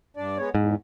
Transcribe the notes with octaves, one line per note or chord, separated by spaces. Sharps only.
G2 D4 D5
G#3 B3 C#5
E2 G#2